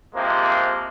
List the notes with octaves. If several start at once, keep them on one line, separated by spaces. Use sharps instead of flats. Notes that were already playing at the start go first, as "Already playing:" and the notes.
C3 F3 G#3 A#3